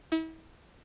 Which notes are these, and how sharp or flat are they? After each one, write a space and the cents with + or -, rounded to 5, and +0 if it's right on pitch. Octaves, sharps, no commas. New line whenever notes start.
E4 -40